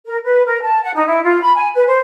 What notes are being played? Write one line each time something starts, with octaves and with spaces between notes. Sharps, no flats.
A#4
B4
A#4
A5
F#5
D#4
E4
F4
B5
G#5
B4
C5